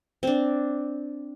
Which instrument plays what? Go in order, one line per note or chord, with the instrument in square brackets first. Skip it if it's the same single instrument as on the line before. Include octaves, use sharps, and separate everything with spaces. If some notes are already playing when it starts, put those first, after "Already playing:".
[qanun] C4 D4